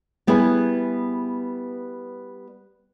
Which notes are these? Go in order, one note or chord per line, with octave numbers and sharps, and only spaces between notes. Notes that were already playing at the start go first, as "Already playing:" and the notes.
G3 B3 E4 G#4 B4